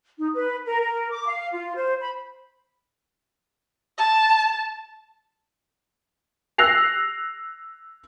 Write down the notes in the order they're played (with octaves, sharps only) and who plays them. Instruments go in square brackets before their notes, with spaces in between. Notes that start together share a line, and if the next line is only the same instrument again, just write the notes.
[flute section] D#4
B4
A#4
A#4
D6
F5
F4
C5
B5
[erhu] A5
[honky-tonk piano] E6 F#6 A#6 C7 F7